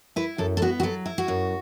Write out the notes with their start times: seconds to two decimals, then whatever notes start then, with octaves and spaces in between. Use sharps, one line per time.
0.16 E4 B4
0.38 F#2 A4
0.57 A4
0.62 B3 F#4
0.80 F#4
0.83 F#3 A4
1.06 E4
1.18 F#4
1.28 F#2